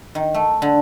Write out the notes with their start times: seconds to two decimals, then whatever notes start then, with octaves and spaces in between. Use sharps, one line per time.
0.15 D#3
0.34 A3
0.62 D3